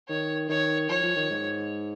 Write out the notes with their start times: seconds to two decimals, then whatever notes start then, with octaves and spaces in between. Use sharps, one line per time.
0.09 D#3 C#5
0.49 D#3 C#5
0.89 F3 C#5
1.03 F3
1.16 D#3
1.31 G#2